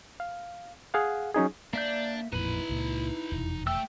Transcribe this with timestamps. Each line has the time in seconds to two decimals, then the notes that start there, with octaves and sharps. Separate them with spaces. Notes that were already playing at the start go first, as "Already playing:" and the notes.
0.20 F5
0.94 G#4 F5 F#5
1.34 F#3 C#4 D#4 G#4
1.73 A#3 D4 D5 E5 G6
2.33 A1 F2 A#2 D#4 E4 B4 B5
2.69 C#2 A#2
3.32 F1 E2 B2
3.67 A3 G5 E6